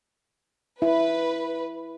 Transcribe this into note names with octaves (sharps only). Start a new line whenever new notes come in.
E4 B4